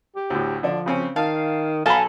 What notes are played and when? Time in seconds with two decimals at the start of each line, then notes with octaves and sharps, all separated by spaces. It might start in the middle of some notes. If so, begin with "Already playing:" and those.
0.16 G4
0.30 D2 A2
0.63 D3 F3 D4
0.86 C#3 C4 C#4
1.16 D#3 F5 A5
1.86 B1 A4 F5 G#5 A#5 B5